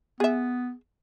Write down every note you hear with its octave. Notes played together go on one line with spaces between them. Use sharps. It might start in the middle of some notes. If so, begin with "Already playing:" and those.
B3 G#4 E5